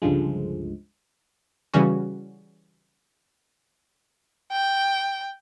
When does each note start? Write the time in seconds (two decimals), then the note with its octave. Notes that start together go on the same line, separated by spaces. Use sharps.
0.02 C#2 G2 D3 F3 G#3
1.74 C#3 E3 G3 C#4 F#4
4.52 G5